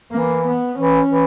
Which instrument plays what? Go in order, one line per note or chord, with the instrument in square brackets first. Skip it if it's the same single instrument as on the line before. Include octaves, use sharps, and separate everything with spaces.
[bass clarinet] E3 [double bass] A#3
[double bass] B3
[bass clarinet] E3 [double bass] C#4
[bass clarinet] E3